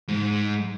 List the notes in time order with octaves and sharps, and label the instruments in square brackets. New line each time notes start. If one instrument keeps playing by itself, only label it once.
[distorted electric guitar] G#2